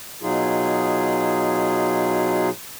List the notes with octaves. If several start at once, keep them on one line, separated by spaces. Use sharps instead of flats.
B2 F#3 D#4 F4 G#4